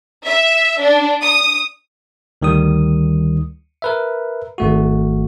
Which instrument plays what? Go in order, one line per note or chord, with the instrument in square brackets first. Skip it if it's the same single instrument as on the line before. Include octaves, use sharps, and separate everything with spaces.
[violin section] E5
D4
D#6
[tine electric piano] D2 D#3 G3 D#6
A#4 B4 E5
G#1 A3 F#4